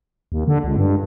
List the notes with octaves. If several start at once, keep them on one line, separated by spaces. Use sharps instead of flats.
D#2
D3
C#2
G2